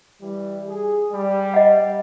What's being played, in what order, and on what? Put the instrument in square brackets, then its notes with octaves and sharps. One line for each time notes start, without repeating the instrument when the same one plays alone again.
[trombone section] E3 G3
G#4
G3
[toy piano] D#5 F#5